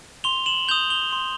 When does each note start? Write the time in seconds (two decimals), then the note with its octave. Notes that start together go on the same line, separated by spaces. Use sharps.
0.24 C6 F7 G7
0.46 E7 F#7
0.68 G6 F7 G7
0.71 D#6
0.90 F7 G7
1.12 C6